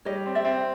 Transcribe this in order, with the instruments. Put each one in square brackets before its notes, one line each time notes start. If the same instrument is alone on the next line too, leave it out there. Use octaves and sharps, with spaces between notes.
[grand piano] G3 [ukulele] C#5 D#5
[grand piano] C4
[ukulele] D5 E5
[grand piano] C4